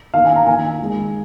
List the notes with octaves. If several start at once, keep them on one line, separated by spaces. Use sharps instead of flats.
D#3 A#3 F5
G#5
A#5
D#3 A#3 G#5
D#3 G#3